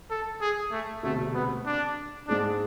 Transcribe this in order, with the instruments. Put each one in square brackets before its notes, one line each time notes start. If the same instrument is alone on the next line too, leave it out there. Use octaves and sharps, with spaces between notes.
[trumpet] A4
G#4
A3
[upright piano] E1 D2 C3 [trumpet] A3
[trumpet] B3
D4
[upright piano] G#2 G#3 C4 G#4 [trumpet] D4